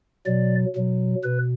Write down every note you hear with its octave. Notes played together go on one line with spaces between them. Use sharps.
B2 F#3 D5
B2 F#3
B2 B4